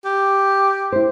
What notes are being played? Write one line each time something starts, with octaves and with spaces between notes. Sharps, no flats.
G4
E4 C5